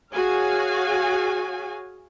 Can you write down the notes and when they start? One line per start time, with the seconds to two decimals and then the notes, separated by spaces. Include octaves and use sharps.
0.13 F#4 G#4 C#5 F5 G#5